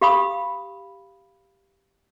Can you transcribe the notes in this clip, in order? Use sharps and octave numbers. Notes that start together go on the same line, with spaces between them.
G4 F5 B5 D#6